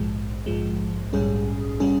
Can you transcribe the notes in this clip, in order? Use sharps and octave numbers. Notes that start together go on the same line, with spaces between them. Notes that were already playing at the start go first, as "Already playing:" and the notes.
Already playing: A#1 G#2 F3 G#3
A#1 G#2 F3 G#3
A#1 G#2 G3 C#4 G#4
G3 C#4 G#4